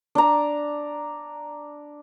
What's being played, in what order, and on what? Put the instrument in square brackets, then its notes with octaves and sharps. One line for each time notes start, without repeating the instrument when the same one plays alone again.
[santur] D4 A#5